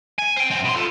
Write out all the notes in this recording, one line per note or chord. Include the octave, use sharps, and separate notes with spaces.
G#5
C5 G5
F#2 C4
B2 C6
F4 A4